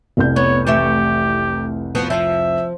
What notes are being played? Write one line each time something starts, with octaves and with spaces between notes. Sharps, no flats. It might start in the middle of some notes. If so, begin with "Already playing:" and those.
F1 C2 G6
B3 C#5
E3 A3 G4 E5
F3 B3 F#4
F3 E5